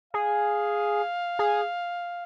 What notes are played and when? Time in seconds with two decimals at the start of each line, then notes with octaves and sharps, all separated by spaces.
0.13 G#4 F5
1.39 G#4